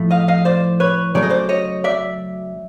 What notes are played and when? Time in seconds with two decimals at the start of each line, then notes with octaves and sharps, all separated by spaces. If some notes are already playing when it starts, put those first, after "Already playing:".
Already playing: A2 F3 A3
0.11 D#5 F5
0.28 D#5 F5
0.45 C5 D5
0.80 B4 C#5
1.15 C#3 F#3 A3 D5
1.23 D#5
1.30 C5 D5
1.49 C#5 D#5
1.84 D5 E5